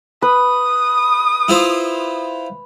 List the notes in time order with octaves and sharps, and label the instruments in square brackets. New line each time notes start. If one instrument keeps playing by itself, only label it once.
[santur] B4 [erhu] D#6
[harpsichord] E4 F4 C5